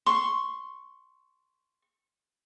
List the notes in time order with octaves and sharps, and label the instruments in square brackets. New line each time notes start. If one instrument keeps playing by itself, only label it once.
[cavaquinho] C6 C#6